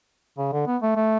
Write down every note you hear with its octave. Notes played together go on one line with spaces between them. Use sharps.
C#3
D3
B3
A3
A3